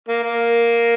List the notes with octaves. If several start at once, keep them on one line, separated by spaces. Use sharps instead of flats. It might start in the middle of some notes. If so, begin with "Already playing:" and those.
A#3
A#3